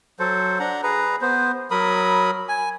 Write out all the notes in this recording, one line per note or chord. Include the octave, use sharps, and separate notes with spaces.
F#3 A4 C5
D4 F#5 A#5
G#4 B4 A#5
B3 C5
F#3 A#4 B5 D#6
G#5